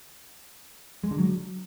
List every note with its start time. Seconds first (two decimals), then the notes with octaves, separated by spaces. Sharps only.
1.04 G#3
1.11 D3
1.18 F#3